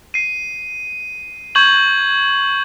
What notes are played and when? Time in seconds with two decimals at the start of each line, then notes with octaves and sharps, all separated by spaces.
0.14 C7 D#7
1.55 C#6 G6 G#6 F#7